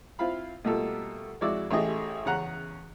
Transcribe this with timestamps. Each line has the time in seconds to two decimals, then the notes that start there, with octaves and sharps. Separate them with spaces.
0.19 C4 E4 F4 F5 B5
0.65 B2 G3 A3 A#3 F4 A4
1.41 F2 G#3 E4 F#4 D5 E6
1.71 A1 A3 E4 G4 G#4 D#5
2.25 E2 C#3 C#4 F#5 A#5 F#6